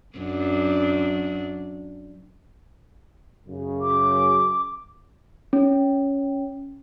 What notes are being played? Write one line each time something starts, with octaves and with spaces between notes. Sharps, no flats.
F#2 D4
F#2 C#3
D6
C#4